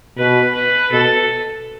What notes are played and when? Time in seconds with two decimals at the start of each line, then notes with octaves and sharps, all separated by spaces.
0.18 B2 B4
0.55 B4
0.92 B2 A4